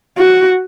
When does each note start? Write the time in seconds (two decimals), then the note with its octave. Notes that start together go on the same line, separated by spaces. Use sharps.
0.17 F#4